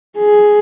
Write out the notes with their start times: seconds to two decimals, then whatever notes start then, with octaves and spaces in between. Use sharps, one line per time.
0.18 G#4